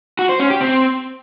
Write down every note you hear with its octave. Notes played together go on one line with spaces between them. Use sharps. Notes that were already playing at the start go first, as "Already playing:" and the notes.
F#4
C5
C#4
G4
C4